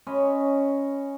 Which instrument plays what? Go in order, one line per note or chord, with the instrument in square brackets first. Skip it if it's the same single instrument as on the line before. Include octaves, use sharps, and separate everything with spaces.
[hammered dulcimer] C#4 C#5 D#5 B5